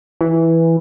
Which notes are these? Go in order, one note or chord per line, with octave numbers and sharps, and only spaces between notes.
E3